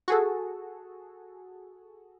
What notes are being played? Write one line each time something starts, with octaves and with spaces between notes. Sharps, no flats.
F#4 G#4 A4